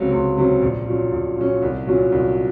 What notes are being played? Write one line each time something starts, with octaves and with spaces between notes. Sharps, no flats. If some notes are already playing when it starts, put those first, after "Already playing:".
Already playing: C#2 C3 F#3 C#4
C#2
C3 F#3 C#4
A#1
A#2 F#3 C#4
A#1
A#2 F#3 C#4
C2
A#2 F#3 C#4
C2